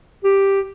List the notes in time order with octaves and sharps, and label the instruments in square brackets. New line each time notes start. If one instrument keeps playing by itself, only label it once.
[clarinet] G4